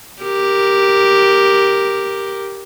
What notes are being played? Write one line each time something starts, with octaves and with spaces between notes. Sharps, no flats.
G4 A#4